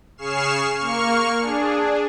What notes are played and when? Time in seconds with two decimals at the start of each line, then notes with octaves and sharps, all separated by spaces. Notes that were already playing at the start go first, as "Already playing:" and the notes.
0.17 C#3 G#4 C#6 F6 C7 E7
0.78 A#3 C#6 F6
1.39 D4 G#4